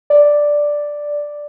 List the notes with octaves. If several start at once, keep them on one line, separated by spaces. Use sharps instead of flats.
D5